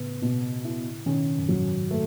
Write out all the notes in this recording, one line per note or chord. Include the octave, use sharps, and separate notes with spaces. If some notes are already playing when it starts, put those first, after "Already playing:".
Already playing: A2 C#3 B3
B2
E4
B2 D#3 C#4
F#2
G#2 F#3
A3